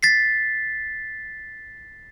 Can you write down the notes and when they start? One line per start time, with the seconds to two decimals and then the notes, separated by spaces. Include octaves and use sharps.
0.03 A6 B6 C7